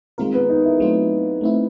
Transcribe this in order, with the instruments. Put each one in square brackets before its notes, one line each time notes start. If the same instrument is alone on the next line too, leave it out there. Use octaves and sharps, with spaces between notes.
[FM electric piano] D#3 G#3 C4 F4 A#4 [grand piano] A#3
[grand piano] B3
D#4
E4
[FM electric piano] F#3 A3 C4 F4
A3 C4 E4